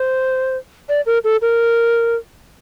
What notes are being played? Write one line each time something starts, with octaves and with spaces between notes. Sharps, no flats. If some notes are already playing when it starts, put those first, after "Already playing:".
Already playing: C5
D5
A#4
A4
A#4